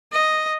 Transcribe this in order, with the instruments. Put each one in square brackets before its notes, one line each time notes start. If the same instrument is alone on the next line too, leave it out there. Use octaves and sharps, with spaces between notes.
[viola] D#5